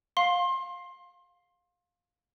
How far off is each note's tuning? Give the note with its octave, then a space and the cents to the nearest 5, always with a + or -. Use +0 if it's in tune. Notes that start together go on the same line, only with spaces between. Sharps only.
F5 +20 C6 +30